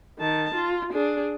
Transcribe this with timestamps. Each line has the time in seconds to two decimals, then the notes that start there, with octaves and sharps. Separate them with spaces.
0.18 D#3 A5
0.55 F4
0.93 D4 G#4